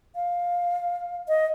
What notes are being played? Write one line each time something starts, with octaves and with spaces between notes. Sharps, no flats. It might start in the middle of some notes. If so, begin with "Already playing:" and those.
F5
D#5